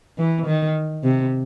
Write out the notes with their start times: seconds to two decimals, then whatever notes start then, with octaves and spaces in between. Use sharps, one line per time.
0.18 E3
0.47 D#3
1.04 C3